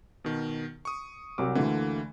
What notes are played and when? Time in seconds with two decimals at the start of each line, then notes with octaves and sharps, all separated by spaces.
0.25 B2 D#3
0.85 C#6 D#6
1.38 C2 F#3 D6
1.55 D2 D3 E3 A3 A#3